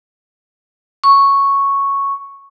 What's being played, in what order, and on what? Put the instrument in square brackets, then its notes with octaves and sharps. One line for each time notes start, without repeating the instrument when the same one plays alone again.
[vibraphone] C#6